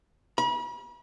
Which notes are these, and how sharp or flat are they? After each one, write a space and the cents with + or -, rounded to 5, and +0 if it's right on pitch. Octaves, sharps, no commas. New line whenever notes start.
B5 -40